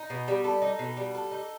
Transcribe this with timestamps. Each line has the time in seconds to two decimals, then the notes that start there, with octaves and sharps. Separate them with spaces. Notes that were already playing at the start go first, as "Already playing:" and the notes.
Already playing: D#4
0.10 B2
0.28 G3
0.44 A4
0.62 D#4
0.79 B2
0.97 G3
1.15 A4
1.32 D#4